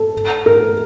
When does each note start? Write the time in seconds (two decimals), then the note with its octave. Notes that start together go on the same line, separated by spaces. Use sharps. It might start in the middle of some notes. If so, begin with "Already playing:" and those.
Already playing: A4
0.46 A#4